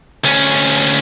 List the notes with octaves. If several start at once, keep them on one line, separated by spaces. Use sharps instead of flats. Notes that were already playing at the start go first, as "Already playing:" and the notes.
D2 C#4